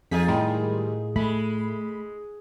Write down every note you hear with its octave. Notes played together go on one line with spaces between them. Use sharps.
F2 D#4 F4 G#4 B6
A2 D#3 G3 G#3
G#3 A3 B5